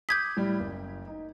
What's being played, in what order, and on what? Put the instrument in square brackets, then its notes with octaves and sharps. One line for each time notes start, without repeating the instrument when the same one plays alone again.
[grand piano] D6 D#6 [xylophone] G6 G#6 B6
[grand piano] A2 G3 D5
F#1
D#4